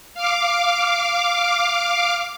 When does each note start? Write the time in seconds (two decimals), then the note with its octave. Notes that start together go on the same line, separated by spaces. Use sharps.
0.14 F5 D6